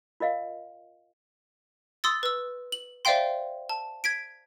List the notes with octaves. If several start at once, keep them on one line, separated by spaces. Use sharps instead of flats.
F4 A#4 D#5 F5
C6 D#6 E6 A6
B4 E6
F#7
C5 D5 E5 F5 G5 C6
A5
G#6 B6 D7